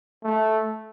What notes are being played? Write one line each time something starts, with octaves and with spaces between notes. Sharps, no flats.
A3